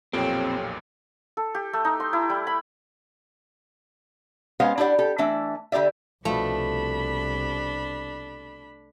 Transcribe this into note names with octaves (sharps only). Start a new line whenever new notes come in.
B1 F2 A#2 C4 G4 A4 C#5 G5
A4
G4
A3
D#4
C6
E4
G3
B5
G#3 B3 C#4 C5 F5 F#5
D4 E4 G4 D5 F#5
G4 A4
E3 A3 D4 E5
D3 F4 G4 D5 E5
C2 B2 F3 A3 D4 B5